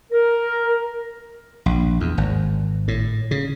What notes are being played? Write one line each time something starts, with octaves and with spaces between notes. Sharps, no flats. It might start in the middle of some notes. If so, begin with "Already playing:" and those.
A#4
A#1
E2
G#1
A2
C#3